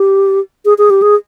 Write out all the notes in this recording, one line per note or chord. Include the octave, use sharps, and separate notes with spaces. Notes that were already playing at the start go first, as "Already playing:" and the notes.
Already playing: G4
G#4
G#4
G4
G#4